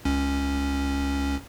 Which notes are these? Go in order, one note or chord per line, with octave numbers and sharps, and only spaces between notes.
C#2 C#4